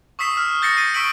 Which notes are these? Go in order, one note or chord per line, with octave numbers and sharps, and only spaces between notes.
C#6 D#6 E6 B6 C7 E7
E6 F6
E6 G6 A6 A#6 C7 C#7
C7 D#7
C#6 E6 B6 D7 F#7